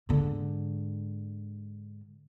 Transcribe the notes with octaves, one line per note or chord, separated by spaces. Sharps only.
G#2 D3